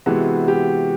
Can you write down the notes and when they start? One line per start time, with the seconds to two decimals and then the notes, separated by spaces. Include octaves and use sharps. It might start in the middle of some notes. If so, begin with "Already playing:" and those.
0.06 C3 E3 G#3 B3 F#4
0.48 G4